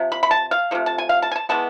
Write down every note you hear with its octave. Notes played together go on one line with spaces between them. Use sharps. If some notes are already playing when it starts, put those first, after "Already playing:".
Already playing: C3 F3
B5
B5
A5
F5
C3 F3 A3
A5
G#5
F5
A5
G#5
A5
E3 G#3 B3 A5